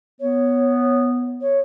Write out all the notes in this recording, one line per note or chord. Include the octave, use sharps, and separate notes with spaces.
B3 C#5
C#5